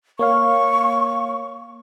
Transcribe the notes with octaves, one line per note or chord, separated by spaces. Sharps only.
A#3 C#5 F5 C#6